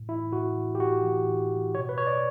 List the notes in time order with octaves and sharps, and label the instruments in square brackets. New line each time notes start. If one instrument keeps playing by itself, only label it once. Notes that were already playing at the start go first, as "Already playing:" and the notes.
Already playing: [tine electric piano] A2
E3 E4
A2 F#4
E3
G4
A2 F#4
E3
A2
E3
B2 C#5
B4
C#5
D5